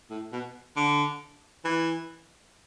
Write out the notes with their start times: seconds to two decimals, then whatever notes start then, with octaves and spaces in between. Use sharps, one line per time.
0.10 A2
0.32 B2
0.76 D3
1.65 E3